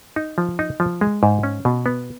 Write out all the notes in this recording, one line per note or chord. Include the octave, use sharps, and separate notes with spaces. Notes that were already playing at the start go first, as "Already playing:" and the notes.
D#4
F3
D#4
F3
G#3
G#2
C#4
B2
B3